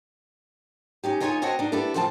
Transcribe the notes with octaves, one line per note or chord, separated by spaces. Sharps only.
C#4 D#4 G4
D2 D#4 F4 C#5 D#5 G#5
C4 F#4 C#5 D#5 F#5 A5
D4 D#4
B3 D4 E4 G4 A4
A2 C#3 F3 C4 E5 A5